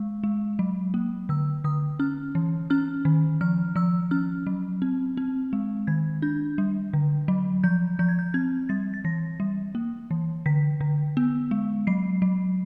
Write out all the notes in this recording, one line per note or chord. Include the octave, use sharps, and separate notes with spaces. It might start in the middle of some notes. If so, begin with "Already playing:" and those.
Already playing: G#3
G#3
F#3
A#3
D3 E6
D3 D#6
C#4 F6
E3
C#4 F6
D#3
F3 F6
F3 E6
C#4 F6
F#3
C4
C4
G#3
D#3 G#6
D4 G6
G3
D3
F#3
F3 G6
F3 G6
G#6
G6
C4 G#6
G3 A6
A6
E3 A#6
G3
A#3
E3
D3 B6
D3
B3
G#3
F#3 C7
F#3